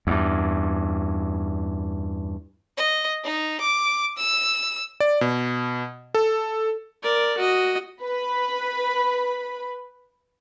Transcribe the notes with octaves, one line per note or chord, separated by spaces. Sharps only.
E2 G2
D#5
D#4
D6
E6
D5
B2
A4
A#4 D5
F#4 D#5
B4 B5